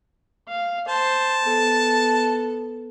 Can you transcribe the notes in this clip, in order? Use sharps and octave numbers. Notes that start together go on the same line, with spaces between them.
F5
C5 A5
B3 A4